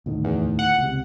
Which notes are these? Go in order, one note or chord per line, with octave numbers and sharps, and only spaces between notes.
D2 A2 D#3
E2
F#5
C#2 C3